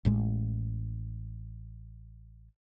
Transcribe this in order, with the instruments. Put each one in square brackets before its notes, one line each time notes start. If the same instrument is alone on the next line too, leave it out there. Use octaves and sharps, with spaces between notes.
[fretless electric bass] A1 A2 G#3